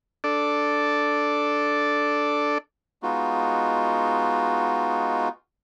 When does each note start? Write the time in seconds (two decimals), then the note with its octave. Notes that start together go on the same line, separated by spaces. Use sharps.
0.24 D4 A4 D5
3.03 G#3 B3 D#4 F4 F#4